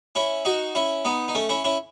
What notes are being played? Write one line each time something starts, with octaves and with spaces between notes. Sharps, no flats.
C#4 E4
D#4 F#4
C#4 E4
B3 D#4
D#4
A3 C#4
C#4 E4
C#4 E4